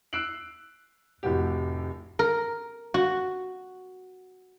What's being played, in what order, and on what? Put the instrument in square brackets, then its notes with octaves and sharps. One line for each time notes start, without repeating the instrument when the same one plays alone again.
[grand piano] E6 F#6 C7 D7 F#7
F1 A2 F#4 G4
[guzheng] A#4
F#4